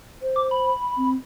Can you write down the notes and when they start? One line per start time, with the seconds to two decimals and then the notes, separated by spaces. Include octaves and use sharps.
0.22 C5
0.36 D6
0.51 B5
0.97 C4